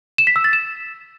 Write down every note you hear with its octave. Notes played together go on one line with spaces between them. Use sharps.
E7
B6
E6
A6
E7